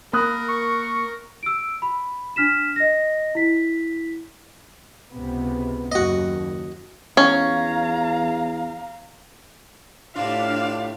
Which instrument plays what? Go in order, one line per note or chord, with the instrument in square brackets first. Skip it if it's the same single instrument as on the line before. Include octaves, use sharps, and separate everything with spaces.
[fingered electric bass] A#3 [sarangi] A#4 [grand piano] B5 D#6 F#6
[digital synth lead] C#6
[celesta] E6 D7
B5
D4 F6 B6 E7
D#5 A#6
E4 B6
[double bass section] C#2 C3 B3
[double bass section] F#1 D#2 [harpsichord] F#4 D#5
[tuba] E2 [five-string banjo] C#4 [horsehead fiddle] F5 A#5
[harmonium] A2 [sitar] C3 F4 [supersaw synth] D4 D5 E7 [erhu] F5